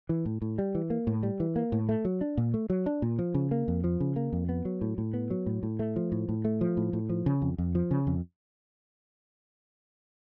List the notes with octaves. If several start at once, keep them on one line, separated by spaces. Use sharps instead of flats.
E3
A2
A2
G3
E3
A#3
A2
G3
E3
A#3
A2
A3
F#3
D4
A#2
A3
F#3
D4
A#2
F3
C#3
A#3
F2
F3
C#3
A#3
F2
B3
F#3
A2
A2
B3
F#3
A2
A2
A3
F3
A2
A2
A3
F3
A2
A2
F3
C#3
F2
F2
F3
C#3
F2